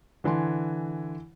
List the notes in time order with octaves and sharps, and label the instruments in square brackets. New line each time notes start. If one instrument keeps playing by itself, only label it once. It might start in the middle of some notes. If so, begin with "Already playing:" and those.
[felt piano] D3 E3 G#5 C6